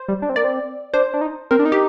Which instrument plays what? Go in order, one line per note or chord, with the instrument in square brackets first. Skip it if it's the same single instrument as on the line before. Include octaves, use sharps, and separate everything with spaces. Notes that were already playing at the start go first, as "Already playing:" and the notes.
Already playing: [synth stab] C5
[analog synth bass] G3
D4
C4
[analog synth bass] A#3 [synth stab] D5
[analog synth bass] C4
[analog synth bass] D4 [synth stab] C5
[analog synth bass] D4
D#4
[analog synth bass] C4 [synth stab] A#4
[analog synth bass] D4
D#4
[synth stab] G4